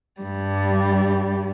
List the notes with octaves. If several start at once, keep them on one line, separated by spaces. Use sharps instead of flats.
G2 G3